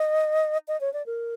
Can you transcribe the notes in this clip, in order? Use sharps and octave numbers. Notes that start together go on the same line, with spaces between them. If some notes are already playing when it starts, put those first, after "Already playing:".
Already playing: D#5
D#5
C#5
D5
A#4